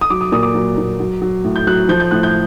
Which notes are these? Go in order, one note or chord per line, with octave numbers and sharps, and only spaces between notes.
D#6
F#3 D6
D#6
A#2 D#6
D6
F#3
A#2
F#3
F#3
A2
G6
F#3 F#6
F3 G6
G6
A2 F#6
G6